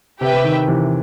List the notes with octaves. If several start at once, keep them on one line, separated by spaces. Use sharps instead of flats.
C3 G4 B4 E5 G5
C3
D#3
C3 E3